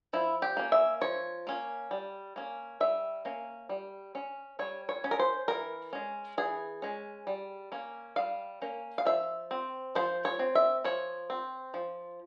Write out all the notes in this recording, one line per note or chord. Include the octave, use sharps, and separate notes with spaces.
F3 E4
G4
A#3 C#4
E5
F3 C#5
A#3 C#4
G3
A#3 C#4
G3 E5
A#3 C#4
G3
C#4
G3 C#5
C#5
C#4
A#4
C5
E3 A#4
G#3 C#4
E3 G#4
G#3 C#4
G3
A#3 C#4
G3 F5
A#3 C#4
F5
F3 E5
C4
F3 C5
C#5
C4
E5
F3 C#5
C4
F3